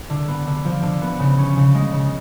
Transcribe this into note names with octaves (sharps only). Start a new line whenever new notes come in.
D3
B3
D3
F3
D3
B3
C#3
C#4
C#3
G#3
C#3